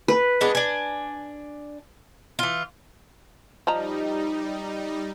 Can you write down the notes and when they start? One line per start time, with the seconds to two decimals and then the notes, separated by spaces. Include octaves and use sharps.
0.08 B4
0.41 G#3 B3 D4
0.55 D4 G#5
2.39 E3 F4
3.67 F3 G3 D#4 D#5 A#5